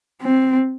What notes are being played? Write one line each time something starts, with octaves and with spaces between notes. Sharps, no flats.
C4